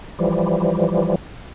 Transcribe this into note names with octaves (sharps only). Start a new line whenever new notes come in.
E3 F3 G3